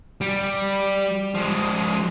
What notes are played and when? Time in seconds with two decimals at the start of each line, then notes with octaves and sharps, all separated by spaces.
0.21 G3
1.34 F3 G#3